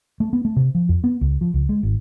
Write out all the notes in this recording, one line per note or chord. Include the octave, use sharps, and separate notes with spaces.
A3
B3
A3
C3
F3
F2
B3
C#2
F3
C#2
G#3
G#1